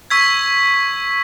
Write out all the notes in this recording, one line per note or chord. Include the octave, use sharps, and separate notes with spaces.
C#6 E6 G#6 B6